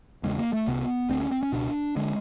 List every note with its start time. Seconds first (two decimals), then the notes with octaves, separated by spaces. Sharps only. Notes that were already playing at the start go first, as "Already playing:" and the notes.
0.23 E2 C#3 G#3
0.38 A#3
0.53 A3
0.67 C2 C3 B3
1.09 D2 D3 C4
1.20 C#4
1.31 C4
1.43 C#4
1.53 C#2 B2 D4
1.96 D3 G#3